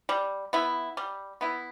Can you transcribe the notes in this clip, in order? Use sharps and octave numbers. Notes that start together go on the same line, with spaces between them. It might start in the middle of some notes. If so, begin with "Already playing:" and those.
G3
B3 E4
G3
B3 E4